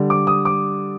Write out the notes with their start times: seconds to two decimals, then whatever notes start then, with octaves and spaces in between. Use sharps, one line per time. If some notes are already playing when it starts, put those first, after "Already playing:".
Already playing: D3 G3
0.10 D6
0.27 D#6
0.45 D6